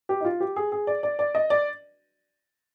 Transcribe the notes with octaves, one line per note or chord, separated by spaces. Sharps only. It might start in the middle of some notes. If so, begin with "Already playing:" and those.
G4
D#4
F4
G4
G#4
G#4
D5
D5
D5
D#5
D5